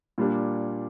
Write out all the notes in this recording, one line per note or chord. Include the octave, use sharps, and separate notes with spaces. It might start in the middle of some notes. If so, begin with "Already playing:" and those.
A#2 G3 A#3 D4 G4